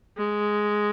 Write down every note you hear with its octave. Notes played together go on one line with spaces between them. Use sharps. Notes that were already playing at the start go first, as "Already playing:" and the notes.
G#3